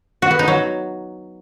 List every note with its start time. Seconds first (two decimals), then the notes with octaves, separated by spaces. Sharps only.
0.22 F#4
0.31 B3
0.39 D#4
0.48 F#3